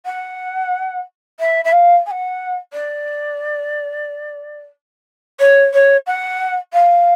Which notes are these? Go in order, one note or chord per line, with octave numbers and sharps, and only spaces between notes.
F#5
E5
E5
F5
G#5
F#5
D5
C#5
C#5
F#5
F5